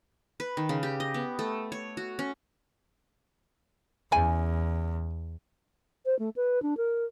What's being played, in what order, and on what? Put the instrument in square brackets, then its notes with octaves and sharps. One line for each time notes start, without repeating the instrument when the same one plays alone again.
[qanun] B4
D#3
C#3
G4
D#5
B3
A3
C#5
F#4
C#4
[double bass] E2 [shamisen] C#3 E4 G#5
[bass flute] C5
A3
B4
D4
A#4